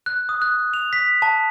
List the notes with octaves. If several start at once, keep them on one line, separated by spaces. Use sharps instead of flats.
F#6
D#6
F#6
F7
B6
A5